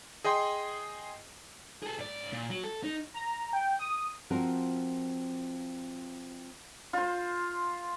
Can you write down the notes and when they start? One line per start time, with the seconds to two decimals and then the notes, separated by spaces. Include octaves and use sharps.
0.24 G#4 D#5 G5 C6
1.83 G#4 A4
1.99 G#2 D5
2.33 A#2
2.50 F#3
2.64 A4
2.83 D#4
3.14 A#5
3.53 G5
3.79 D#6
4.30 F3 C4 F4 F#4 A#4
6.93 F4 C5